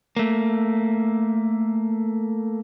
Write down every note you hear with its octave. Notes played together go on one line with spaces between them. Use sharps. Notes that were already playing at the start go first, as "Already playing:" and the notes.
A3 A#3